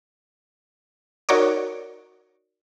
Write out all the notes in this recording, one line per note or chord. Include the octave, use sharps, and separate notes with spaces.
D#4 F#4 A#4 C#5 D5